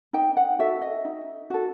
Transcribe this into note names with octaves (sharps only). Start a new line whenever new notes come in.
D#4 G5
F#5
F#4 A4 E5
D#5
D#4
F#4 A4